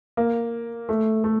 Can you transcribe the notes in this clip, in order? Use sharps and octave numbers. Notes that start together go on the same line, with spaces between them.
A#3
A3
A3